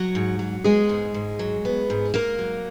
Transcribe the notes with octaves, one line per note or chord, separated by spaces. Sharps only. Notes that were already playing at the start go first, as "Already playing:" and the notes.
Already playing: F#3 F#4
G#2
F#3
G#3 B3 G#4
G#2
G#2
F#3
B3
G#2
G#2 A#3 A#4
F#3